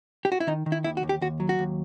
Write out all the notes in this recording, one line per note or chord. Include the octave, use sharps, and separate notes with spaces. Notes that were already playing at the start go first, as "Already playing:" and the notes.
G4
F#4
E4
D#3 D#4
D#3
E4
D#2 E4
F#4
D#2
G4
D#2 F#4
F#3
F#4
D#2